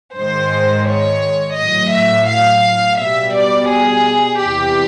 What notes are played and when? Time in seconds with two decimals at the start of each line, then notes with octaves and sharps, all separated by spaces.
0.18 G#2 D#3 G#3 C5
0.88 C#5
1.59 A2 F#3 D#5
1.94 E5
2.30 F5
3.00 B2 G3 E5
3.36 D5
3.71 G#4
4.42 E2 C3 E3 G3 G4